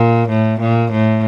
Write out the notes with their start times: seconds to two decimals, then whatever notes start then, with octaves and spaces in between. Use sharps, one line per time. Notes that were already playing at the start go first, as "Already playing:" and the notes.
Already playing: A#2
0.29 A2
0.60 A#2
0.92 A2